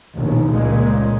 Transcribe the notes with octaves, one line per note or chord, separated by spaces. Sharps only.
A#1 D#2 B2
C#2 A#2 C#3 G#3